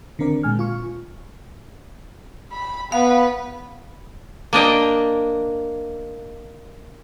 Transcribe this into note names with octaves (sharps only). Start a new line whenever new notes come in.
D3 D#3 C4 A#4 D5
A#2 G#3 G#5 F6
F4 C#6
B5
B3 B4 F5
A#3 D4 D#5 G5